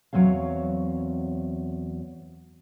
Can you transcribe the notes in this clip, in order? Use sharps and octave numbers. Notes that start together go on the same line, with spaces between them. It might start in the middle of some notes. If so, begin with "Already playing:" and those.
E2 F#3 C4 C#5 F5